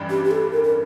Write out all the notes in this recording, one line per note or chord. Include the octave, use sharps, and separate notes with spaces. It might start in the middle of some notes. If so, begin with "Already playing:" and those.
Already playing: A1 G2 E3 G3 D4
G4
G4
A4
A#4
A#4